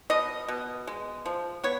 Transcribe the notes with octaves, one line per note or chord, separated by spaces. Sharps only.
B2 D#5
B2
G#3
F3
B3 C#5